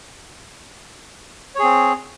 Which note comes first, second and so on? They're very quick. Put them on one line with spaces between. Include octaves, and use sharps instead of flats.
C#5 G#4 C4